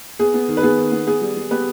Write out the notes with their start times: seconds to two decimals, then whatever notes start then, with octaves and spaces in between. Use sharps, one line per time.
0.19 B3 G#4
0.34 B3
0.48 D#3
0.57 B4
0.63 B3 G#4
0.78 D#3
0.92 B3
1.07 B3 G#4
1.22 G3
1.37 G3
1.51 B3 G4 B4